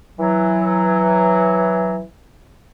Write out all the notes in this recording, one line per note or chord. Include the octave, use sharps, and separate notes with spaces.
E3 F#3